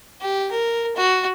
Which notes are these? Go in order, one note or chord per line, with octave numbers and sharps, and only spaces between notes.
G4
A#4
F#4